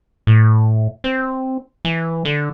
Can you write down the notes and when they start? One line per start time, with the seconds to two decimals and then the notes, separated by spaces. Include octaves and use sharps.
0.27 A2
1.04 C4
1.85 E3
2.25 D3